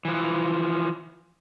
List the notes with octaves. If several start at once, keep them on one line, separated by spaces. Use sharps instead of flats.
E3 F3